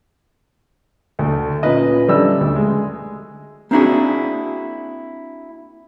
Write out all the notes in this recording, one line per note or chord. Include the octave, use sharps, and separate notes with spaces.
D2 A3
A#2 C#4 B4 D#5
D3 G3 C#4 E5 E6
D2
G#3
A#3 C4 D4 E4 F#4 G#4